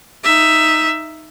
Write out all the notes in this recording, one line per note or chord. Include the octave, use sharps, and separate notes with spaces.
D#4 E5